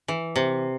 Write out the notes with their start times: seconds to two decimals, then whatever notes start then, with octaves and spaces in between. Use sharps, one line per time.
0.08 E3
0.36 C3